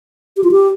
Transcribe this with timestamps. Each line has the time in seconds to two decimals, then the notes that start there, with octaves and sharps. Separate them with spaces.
0.37 G4
0.44 F4
0.52 G4